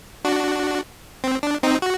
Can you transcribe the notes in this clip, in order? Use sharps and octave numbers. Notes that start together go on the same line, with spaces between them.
D4 F#4
C4
D4
C4 D#4
F#4